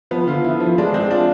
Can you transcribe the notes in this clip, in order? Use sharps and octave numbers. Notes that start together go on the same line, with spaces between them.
F3 B3
D3 F4
E4
F3
G#3 D4
G#3 C4
D4 F4